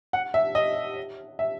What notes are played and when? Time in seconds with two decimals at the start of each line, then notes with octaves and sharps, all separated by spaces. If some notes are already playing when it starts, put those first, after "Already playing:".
0.13 F#5
0.34 E5
0.55 D#5
1.39 E5